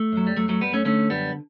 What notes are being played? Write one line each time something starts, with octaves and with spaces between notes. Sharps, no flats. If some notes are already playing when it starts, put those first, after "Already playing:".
Already playing: A3
F#2 F#3
G3
F#2 F#3 A3
F#3 A3
F#2 G3 B3
A3 C#4
D3 A3 C#4
F#2 G3 B3